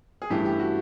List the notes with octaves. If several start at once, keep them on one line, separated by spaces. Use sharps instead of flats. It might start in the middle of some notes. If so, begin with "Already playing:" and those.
G#4
G2 E3 A3 C#4 E4 G4
G4
F#4